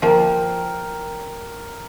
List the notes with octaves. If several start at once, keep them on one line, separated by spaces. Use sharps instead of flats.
F3 A#3 A#4 G5